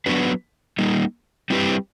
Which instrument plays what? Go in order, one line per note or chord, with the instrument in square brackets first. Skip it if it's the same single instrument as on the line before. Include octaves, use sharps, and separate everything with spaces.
[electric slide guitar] F#3 B3 D4 F#4 B4
G3 A#3 D#4
G3 C4 E4 G4 B4